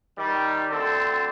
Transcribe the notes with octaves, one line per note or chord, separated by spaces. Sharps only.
D#3 G3
D2 D3 C4 A4